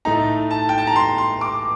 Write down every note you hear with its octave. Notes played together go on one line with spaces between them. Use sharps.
A2 A3 D#4 A#5
A5
G5
A5
A#5
C6
C6
D6